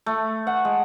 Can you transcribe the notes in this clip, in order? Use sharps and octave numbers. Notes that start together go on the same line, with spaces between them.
A3
F#5
G#3